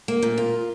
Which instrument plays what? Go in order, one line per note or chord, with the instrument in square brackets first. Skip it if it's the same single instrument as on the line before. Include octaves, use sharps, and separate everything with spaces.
[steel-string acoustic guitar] A#3
A#2
F4